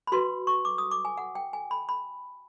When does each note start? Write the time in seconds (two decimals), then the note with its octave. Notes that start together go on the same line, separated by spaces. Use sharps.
0.07 B5
0.12 F#4 B4 C6
0.47 C#6
0.65 D6
0.78 D#6
0.91 D6
1.05 G#5
1.18 F#5
1.35 G5
1.53 G#5
1.71 B5
1.89 B5